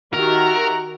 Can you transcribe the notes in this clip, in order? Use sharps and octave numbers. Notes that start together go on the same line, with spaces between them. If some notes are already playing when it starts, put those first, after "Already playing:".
D#3 F#4 G4 A#4 E5 F#5 A#5